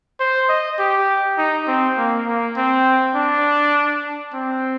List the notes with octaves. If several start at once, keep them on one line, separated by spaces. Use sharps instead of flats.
C5
D#5
G4
D#4
C4
A#3
A#3
C4
D4
C4